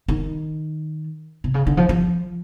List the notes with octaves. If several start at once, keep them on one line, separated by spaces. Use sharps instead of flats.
D#3
C3
C#3
D3
F3
F3